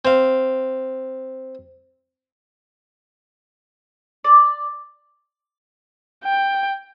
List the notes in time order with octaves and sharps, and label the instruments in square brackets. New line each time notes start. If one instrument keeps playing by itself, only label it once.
[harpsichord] C4 F5
[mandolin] D5
[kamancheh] G5